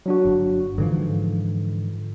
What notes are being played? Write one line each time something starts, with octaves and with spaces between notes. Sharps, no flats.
F#3 D4 F#4
G1
G#2 D3 E3 F3